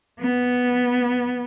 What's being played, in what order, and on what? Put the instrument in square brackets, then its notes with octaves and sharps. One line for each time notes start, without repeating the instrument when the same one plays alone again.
[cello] B3